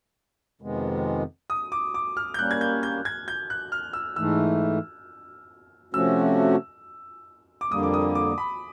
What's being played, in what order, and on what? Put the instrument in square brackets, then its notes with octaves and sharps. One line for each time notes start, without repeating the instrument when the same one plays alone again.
[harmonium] F2 C3 D#3 G#3 B3
[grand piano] D#6
D6
D6
F6
G6
[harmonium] G3 A#3 C#4 [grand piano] F#6
[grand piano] G#6
G6
G6
G#6
G6
F#6
F6
E6
[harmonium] G#2 E3 A3 [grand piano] E6
[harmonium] C3 F3 A3 C#4 F#4 [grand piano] E6
[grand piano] D6
[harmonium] F2 D3 G3 A#3 [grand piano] D#6
[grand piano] D6
D#6
D6
B5